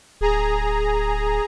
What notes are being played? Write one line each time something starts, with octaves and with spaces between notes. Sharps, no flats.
D1 G#4 A#5